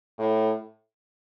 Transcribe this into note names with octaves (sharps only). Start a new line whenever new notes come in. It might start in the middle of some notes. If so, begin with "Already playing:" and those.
A2